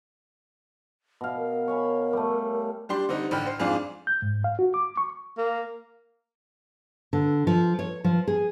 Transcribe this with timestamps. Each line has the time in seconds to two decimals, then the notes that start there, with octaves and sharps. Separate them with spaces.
1.21 B2 F5
1.36 A#4
1.68 C#5 G#5 B5
2.13 G3 A3
2.89 G3 D4 G4 C6
3.09 D3 G3 C4 D#4
3.31 A1 D3 G5 B5 F6
3.46 C5
3.59 F2 G#2 D4 F4 G#4 F5
4.07 G6
4.22 G#2
4.44 F5
4.59 F#4
4.74 D6
4.97 C#6
5.38 A#3
7.13 D3
7.47 F3
7.79 C#5
8.04 F3
8.28 G#4